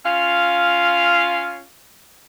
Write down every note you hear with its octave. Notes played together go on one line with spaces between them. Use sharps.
C#4 F4 F5